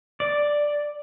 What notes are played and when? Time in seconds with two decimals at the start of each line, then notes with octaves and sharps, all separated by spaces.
0.20 D5